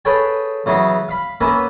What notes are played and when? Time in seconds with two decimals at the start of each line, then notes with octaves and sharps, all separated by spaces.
0.05 G#4 A4 B4 C#5 G5 G#5
0.66 C#3 E3 F#3 B3
1.08 F5 B5
1.41 A#3 B3 C#4 B4 E5 G#5